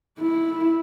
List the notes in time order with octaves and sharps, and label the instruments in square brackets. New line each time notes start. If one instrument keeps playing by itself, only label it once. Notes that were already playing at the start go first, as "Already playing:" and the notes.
[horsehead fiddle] E4